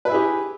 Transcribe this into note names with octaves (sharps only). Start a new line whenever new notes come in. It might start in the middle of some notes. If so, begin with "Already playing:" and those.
E4 G4 G#4 B4